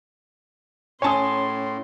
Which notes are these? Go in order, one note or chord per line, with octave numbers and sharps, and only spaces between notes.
A2 C#4 C#5 G#5 A5 C6 D#6